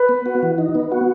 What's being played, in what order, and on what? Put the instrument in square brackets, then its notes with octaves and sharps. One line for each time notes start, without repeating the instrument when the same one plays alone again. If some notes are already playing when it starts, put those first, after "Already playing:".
Already playing: [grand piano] B4
[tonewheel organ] B3
F#4
E3
D#4
B3
F#4